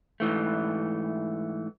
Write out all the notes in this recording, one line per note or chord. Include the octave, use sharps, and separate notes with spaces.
G#2 E3 A3